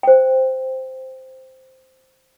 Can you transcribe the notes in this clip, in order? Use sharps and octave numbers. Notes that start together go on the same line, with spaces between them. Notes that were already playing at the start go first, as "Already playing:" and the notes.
C5 G5